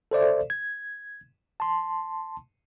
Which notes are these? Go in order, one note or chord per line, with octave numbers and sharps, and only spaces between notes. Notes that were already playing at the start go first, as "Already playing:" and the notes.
A4 C5 D5 E5
G#6
A5 C6